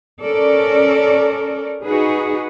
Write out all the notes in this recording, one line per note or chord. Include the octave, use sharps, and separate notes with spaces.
C#4 A4 A#4 D5
D#4 F#4 G#4 B4